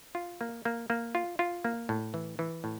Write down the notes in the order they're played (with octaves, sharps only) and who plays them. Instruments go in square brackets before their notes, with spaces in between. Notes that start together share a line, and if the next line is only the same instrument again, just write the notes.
[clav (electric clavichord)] F4
A#3
A#3
A#3
F4
F4
A#3
A2
E3
E3
A2